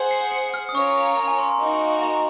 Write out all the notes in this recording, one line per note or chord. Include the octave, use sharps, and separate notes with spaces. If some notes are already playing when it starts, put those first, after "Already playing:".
Already playing: G#4 C5 F#5
C7
C#7
F6
D#6
C#4 F4 A#4 C#5 C#6
A#5
G#5
C6
C6
A#3 D#4 F#4
A#5